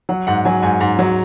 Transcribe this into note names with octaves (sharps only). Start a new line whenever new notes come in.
F#3 F#5
G#2 F#5
F#3 G#5
G#2 G#5
G#2
F#3